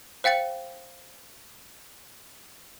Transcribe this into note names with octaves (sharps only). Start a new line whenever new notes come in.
C5 F5 G5 A6 C#7